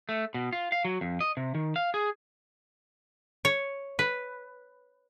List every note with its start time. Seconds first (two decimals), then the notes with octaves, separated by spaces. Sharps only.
0.09 A3
0.34 B2
0.53 F4
0.72 F5
0.85 F#3
1.01 F2
1.21 D#5
1.37 C3
1.55 D#3
1.76 F5
1.94 G#4
3.45 C#5
3.99 B4